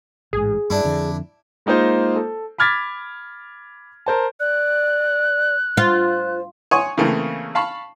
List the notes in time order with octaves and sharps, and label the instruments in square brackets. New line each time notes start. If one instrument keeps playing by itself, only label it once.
[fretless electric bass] A1 G#2 [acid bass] G#4
[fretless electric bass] G2 [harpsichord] D4 E4
[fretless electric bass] F2 D3
[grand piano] G#3 A#3 D#4 F4 C5 D#5
A4
B5 D6 F6 G#6 A6 B6
A#4 C5 A5
[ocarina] D5 [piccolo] F#6
[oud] F4 [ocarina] C5
[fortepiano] C#5 F#5 G#5 C6 C#6 D#6
C#3 E3 A3 A#3 C4
F5 A5 B5 C#6